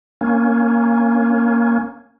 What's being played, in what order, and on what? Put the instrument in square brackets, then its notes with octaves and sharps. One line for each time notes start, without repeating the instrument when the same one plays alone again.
[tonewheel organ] A#3 C#4